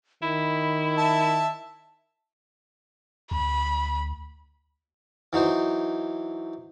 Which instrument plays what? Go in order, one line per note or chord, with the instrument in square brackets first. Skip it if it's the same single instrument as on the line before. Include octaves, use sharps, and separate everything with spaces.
[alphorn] D#3 [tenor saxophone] E4 [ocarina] B5
[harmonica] E5 A5
[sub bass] D2 [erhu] B5
[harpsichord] E3 F#3 D#4 C5